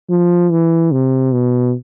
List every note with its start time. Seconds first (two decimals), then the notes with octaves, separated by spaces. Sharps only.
0.10 F3
0.51 E3
0.92 C3
1.32 B2